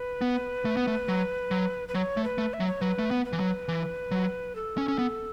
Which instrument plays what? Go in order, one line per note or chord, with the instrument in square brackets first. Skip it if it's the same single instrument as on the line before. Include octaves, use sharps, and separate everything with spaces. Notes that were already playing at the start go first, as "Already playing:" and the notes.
Already playing: [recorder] B4
[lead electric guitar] B3
A3
B3
A3
F#3
F#3
[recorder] B4
[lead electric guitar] F#3 [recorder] C#5
[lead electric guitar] A3
[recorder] B4
[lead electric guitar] A3
[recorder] E5
[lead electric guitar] F#3
[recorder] C#5
[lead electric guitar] F#3 [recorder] B4
[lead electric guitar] A3
B3
[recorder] B4
[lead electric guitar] E3
F#3
E3
F#3
[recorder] A4
[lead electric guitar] C#4
C#4
B3